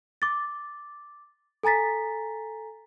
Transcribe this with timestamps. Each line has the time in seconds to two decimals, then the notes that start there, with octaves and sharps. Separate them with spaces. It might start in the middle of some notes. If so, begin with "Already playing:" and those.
0.22 D6 A6
1.63 A4 G#5 A#5 A6 B6